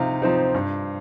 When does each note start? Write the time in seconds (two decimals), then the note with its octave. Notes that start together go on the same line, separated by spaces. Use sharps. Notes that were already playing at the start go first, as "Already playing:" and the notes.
Already playing: C3 F3 C4 D#4 F5
0.22 F3 C4 D#4
0.54 G2